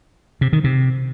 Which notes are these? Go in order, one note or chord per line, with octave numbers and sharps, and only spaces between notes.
C3
D#3
C3